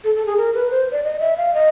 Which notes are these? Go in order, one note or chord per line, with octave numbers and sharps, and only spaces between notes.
A4
A4
G#4
A#4
B4
C5
D5
D#5
E5
F5
D#5